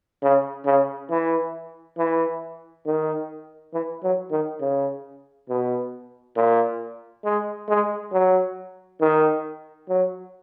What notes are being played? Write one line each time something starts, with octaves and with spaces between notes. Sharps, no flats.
C#3
C#3
E3
E3
D#3
E3
F#3
D#3
C#3
B2
A#2
G#3
G#3
F#3
D#3
F#3